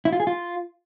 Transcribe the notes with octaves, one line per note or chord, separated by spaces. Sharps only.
E4
F4
G#4
F4